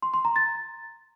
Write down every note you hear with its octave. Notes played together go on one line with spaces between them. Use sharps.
C6
C6
A#5
A6